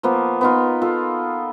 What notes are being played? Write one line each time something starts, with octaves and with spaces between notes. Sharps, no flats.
F3 A#3 B3
B3 D#4 F4
F4 A4